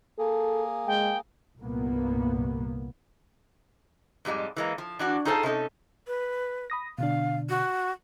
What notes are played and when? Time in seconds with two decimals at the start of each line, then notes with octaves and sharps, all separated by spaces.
0.19 A#3 G#4 A4
0.87 G#3 G5
1.59 C2 G2 A#2 A#3 B3
4.25 F2 G#2 G3 G#3
4.56 E3 G#3 A#3
4.78 F3
4.99 E3 D4 F#4
5.25 D#4 F4 G#4 A4 C5 A5
5.43 C3 C#4 D#4 A4
6.07 B4
6.70 B5 D#6 A#6
6.98 B2 D3 D4 F5
7.49 F#4